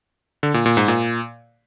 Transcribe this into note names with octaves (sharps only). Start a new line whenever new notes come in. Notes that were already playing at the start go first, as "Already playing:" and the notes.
D3
A#2
A#2
G#2
A#2